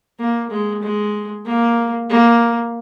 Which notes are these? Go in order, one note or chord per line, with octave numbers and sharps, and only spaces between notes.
A#3
G#3
G#3
A#3
A#3